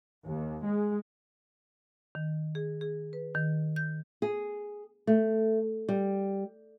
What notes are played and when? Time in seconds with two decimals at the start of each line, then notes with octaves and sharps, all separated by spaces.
0.24 D#2
0.65 G#3
2.15 D#3
2.55 G#4
2.81 G#4
3.13 B4
3.35 D#3
3.76 G6
4.22 G#4
5.07 A3
5.89 G3